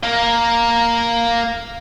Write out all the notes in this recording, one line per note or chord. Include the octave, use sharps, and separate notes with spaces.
A#3 A#4